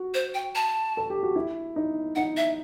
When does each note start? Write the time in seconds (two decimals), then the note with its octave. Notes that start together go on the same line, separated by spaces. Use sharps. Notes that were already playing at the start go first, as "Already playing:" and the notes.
Already playing: F#4
0.14 C5
0.34 G5
0.55 A5
0.97 A4
1.10 G4
1.23 F#4
1.36 E4
1.76 D#4
2.16 D#4 F#5
2.37 E5